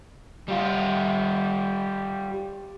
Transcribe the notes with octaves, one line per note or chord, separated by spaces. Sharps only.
G3 F4